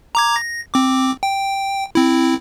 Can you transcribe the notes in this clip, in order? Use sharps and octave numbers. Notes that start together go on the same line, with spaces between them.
A#5 D6 G#6
A#6
C4 D6
G5
C4 E4